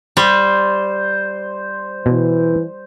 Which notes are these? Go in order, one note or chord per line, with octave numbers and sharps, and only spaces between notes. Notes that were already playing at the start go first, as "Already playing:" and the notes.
G3 C5
B2 E3